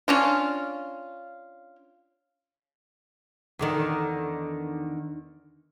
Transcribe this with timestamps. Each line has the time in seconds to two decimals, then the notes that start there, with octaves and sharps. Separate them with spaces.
0.08 C#4 D4 F4
3.59 E2 D3 D#3